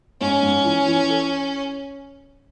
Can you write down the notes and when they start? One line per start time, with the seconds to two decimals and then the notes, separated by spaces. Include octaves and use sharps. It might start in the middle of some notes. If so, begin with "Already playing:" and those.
0.21 G#2 C#4
0.43 G#2
0.65 E3
0.88 E3
1.10 A4